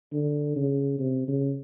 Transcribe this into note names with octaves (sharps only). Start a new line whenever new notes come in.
D3
C#3
C3
C#3